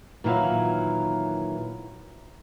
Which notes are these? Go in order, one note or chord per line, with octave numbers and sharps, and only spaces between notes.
A#2 D#3 E3 F#3 E4 F5